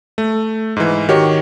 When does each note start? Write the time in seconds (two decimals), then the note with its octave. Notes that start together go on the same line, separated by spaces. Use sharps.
0.18 A3
0.76 G#2 E3
1.09 D#3 F#4 G4 C#5